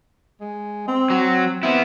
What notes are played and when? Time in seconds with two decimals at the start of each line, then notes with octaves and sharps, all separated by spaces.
0.41 G#3
0.88 C4
1.10 F#3
1.63 B3 C4 E4